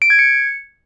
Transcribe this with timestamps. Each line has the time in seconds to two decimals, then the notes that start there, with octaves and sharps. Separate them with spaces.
0.02 D7
0.10 G#6
0.19 C#7